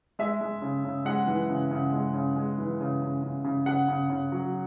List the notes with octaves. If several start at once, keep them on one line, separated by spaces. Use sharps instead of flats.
G#3 E5
G#3
C#3
C#3
G#3 F#5
E3
C#3
C#3
G#3
C#3
G#3
E3
C#3
C#3
C#3
C#3
C#3 F#5
C#3
C#3
F#3